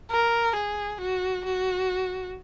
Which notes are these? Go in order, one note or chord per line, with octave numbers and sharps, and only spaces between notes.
A#4
G#4
F#4
F#4